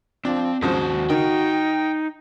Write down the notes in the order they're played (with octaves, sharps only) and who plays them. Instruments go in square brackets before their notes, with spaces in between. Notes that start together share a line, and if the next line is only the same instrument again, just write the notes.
[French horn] F3 [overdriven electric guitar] C4 [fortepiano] D4
[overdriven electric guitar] D#2 C5 [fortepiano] G#2 C#3 F3 [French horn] F#4
[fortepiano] D#3 [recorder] D#4 [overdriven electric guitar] G5